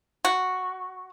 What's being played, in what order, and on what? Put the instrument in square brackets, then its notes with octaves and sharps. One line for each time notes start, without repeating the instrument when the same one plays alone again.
[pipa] F#4